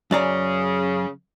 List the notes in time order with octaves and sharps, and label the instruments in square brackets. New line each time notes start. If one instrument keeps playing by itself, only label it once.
[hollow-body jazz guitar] F#2 D5 A#5 [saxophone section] C#3